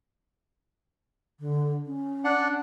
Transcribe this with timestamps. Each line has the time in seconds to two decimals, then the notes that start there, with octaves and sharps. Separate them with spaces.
1.40 D3
1.86 C#4
2.24 D4 F#5